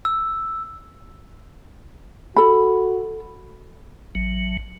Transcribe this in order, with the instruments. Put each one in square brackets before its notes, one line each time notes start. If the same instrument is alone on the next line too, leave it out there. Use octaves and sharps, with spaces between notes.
[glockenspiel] E6
[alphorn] F#4 [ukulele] A4 B5
[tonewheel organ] A1 F#3